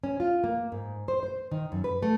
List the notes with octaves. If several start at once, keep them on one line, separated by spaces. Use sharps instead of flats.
C#4
F4
A#3
G#2
C5
C5
D#3
F#2
B4
A3